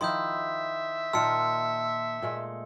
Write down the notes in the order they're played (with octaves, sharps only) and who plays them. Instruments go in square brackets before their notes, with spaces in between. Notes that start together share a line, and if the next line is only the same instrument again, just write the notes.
[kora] D#3 F3 E4 [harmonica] E5 [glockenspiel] C6 D#6 G6
[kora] A#2 D#3 A#4 [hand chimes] A5 C6 [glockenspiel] E6 C#7
[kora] A#2 G#3 A3